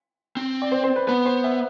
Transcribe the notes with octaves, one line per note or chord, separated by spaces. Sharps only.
C4
D5
C5
C5
B4
B3 B4
C5
E5